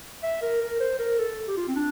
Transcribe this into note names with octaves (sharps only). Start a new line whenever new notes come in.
E5
A#4
A#4
C5
A#4
A4
G4
F4
C4
D4